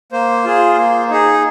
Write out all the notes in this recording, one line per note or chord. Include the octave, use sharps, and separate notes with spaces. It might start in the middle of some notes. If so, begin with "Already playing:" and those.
A#3 C5
F4 G#4
A#3
D#4 G#4